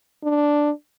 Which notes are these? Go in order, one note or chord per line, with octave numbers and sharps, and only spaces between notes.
D4